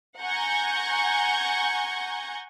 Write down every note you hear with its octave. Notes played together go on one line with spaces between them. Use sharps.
F#5 G#5 A#5 C#6 G6